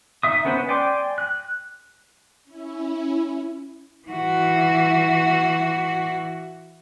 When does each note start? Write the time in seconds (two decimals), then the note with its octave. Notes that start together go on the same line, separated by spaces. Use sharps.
0.23 D#4 E5 D#6
0.45 B3 C#4 B4 C5
0.69 D5 G5 G#5 C6 D6
1.18 F#6
2.44 C#4 E4
4.08 E3 F#4